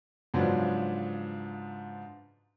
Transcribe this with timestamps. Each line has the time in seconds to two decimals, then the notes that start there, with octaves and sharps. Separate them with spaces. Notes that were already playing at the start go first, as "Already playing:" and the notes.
0.34 G#2 C#3 F3 F#3 B3 D4